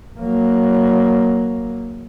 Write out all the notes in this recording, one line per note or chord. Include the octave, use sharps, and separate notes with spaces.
F#3 A#3